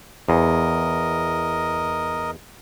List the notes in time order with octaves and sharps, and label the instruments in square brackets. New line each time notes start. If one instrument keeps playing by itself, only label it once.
[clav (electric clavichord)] E2 [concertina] A#4 D#5